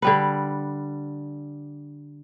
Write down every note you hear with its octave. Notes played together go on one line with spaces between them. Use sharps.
D3 G3 B4